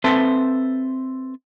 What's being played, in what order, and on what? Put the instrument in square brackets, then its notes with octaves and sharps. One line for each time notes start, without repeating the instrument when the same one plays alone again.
[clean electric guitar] C4 A4 B4 C5 E5 A5